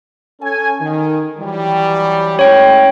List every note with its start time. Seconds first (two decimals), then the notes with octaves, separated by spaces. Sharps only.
0.41 C#4 A4 G#5
0.81 D#3
1.39 E3 F#3 G3
2.39 G#3 A3 C#4 C#5 G5